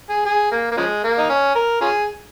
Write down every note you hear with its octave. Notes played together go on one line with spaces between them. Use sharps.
G#4
G#4
A#3
A#3
C#3 F3 G#3
A#3
D#4
C#4
A#4
C#4 F4 G#4